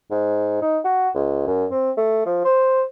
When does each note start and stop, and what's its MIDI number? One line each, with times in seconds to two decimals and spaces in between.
0.11 0.59 44
0.62 0.79 63
0.85 1.09 66
1.15 1.45 37
1.47 1.66 42
1.71 1.91 60
1.97 2.25 57
2.26 2.41 53
2.45 2.83 72